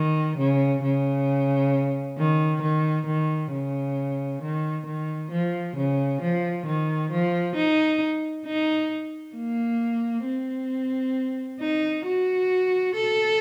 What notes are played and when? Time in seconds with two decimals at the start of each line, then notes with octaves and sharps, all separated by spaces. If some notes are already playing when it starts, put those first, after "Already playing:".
Already playing: D#3
0.38 C#3
0.83 C#3
2.18 D#3
2.62 D#3
3.07 D#3
3.52 C#3
4.42 D#3
4.87 D#3
5.32 F3
5.77 C#3
6.22 F3
6.66 D#3
7.11 F3
7.56 D#4
8.46 D#4
9.36 A#3
10.25 C4
11.60 D#4
12.05 F#4
12.95 A4